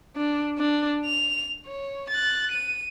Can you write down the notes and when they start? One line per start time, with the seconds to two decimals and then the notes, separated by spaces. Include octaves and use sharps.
0.16 D4
0.58 D4
1.06 F7
1.67 C#5
2.10 F#6 A6
2.52 D#7